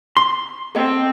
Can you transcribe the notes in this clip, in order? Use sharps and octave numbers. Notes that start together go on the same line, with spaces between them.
C6
C4 A4 D#5 G5